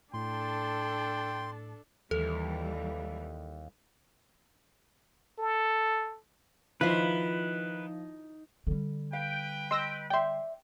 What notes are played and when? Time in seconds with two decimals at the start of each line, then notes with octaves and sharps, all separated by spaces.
0.14 A2 D4 A4 G5 C6
2.11 D#2 E3 G3 A4
5.39 A4
6.81 D#3 F3 E4 F4 B4 C5
8.67 D3 G3
9.13 B4 F5 G5
9.71 D#5 C6 E6 A#6
10.10 D5 E5 G5 C6